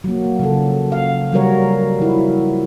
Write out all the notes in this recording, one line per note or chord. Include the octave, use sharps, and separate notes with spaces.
F#3 A#3
C#3 F3 A4
F5
F#3 G3 F#4 A#4 C#5
F3 E4